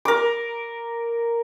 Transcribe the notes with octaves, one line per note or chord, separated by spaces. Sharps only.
A#4 D6